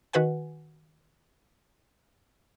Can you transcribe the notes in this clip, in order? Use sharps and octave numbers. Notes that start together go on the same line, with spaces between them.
D#3 F#4 B4 F#5 G#5